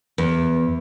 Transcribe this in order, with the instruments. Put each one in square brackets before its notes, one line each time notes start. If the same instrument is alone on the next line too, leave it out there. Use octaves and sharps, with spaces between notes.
[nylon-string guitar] E2